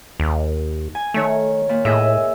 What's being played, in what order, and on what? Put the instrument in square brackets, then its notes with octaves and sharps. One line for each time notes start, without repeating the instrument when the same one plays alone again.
[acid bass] D#2
[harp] G#5
[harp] D#3 C#5 [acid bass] A3
[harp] A#2
[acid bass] A2 [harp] G#4 D#5 E5